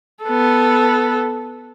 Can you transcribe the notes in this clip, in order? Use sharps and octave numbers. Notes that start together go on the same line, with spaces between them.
B3 A4